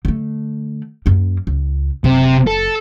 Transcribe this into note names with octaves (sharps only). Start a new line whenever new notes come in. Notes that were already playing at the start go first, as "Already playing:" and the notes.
D3 A3
F#2 A#3
C#2
F#1 C3
A4